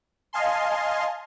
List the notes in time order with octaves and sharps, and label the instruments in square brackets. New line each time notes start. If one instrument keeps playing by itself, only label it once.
[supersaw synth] D#5 F5 G#5 A5 C6